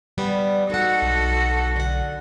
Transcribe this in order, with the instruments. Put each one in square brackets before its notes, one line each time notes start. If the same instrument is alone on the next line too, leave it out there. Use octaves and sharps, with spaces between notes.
[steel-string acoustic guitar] G3 B3 D5
[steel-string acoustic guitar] D#4 F#5 [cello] F#4 A4
[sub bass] B1
[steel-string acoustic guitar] D3 F#5